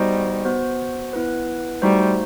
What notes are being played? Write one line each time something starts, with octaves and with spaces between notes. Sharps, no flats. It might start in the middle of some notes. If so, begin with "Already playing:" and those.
Already playing: G3 B3 D#4 F#4 C5 D#5
B3 F#4 C5
B3 E4 B4
G3 A3 D#4 F#4 C5